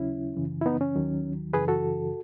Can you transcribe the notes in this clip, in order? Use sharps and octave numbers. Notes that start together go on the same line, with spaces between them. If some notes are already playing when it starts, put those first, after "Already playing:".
Already playing: D#2 C#3 F#3 C#4 E4
F#2 C#3 E3
E4
B3 D#4
C#4
D#2 D#3 F#3
F#2 C#3 E3 G#4 B4
F#4 A4